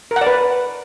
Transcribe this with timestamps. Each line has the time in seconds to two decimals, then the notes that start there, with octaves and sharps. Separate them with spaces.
0.11 A#4
0.16 F#5
0.21 D5
0.27 B4